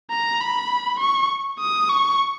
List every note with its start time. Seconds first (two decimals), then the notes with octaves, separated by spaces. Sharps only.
0.11 A#5
0.41 B5
1.00 C#6
1.59 D#6
1.89 C#6